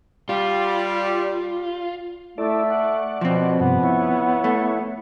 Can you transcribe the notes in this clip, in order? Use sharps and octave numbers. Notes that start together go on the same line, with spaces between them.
G3 F4
A3 E4 A4 D5
D5 F#5
B2 F3 C4
G2 C3 B3
E4 C#5
A3